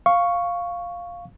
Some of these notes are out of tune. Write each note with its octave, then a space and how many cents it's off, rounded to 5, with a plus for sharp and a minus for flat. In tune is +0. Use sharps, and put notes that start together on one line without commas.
F5 +0 C#6 +0